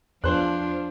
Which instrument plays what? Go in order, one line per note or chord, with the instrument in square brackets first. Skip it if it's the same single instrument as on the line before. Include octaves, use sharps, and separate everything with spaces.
[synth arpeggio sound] E2 [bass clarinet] F3 [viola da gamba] D4 F4 [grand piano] C5 F#6